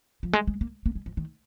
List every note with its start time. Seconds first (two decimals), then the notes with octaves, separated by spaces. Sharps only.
0.23 F3
0.33 G#3
0.47 G#3
0.61 A#3
0.86 A#3
0.95 G#3
1.06 F3
1.17 D#3